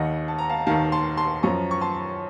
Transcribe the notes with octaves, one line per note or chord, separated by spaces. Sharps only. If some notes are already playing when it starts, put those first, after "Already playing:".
Already playing: D#2 D#3 D#5 F#5
A5
A#5
F5 A5
D#2 D#3 F5 A5
A5 C6
A5 C6
F#2 F3 A#5 C#6
C#6
A5 C6